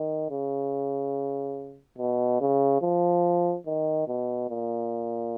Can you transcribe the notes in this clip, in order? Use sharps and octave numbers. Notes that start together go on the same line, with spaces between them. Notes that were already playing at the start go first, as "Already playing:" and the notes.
Already playing: D#3
C#3
B2
C#3
F3
D#3
B2
A#2